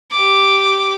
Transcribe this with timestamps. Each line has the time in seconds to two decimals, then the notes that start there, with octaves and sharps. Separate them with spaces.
0.11 G4 D6